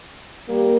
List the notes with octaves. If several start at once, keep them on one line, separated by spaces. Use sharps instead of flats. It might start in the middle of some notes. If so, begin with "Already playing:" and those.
G3 A#3